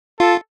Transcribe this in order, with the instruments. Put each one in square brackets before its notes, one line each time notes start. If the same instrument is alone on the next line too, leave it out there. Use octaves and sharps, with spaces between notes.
[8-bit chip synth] F4 [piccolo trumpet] A4